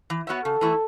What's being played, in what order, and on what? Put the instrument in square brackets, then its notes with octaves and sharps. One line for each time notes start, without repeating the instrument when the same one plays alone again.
[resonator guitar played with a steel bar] E3
B3 F#4 C#5 E5
[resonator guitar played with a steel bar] C#3 [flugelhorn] A4
[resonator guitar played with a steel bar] E3 A3 E4